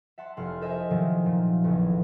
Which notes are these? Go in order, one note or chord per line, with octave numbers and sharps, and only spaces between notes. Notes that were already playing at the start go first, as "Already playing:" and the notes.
E5 F#5 A5 C6
F1 E4 F#5 G#5 C6 F6
A4 A#4 C5 D#5 E5 G#5
C3 D#3 F3 F#3 A#3 C4
A#2
A1 E2 C#3 E3